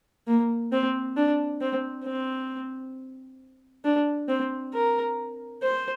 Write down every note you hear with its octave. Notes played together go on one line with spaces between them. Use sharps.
A#3
C4
D4
C4
C4
D4
C4
A#4
C5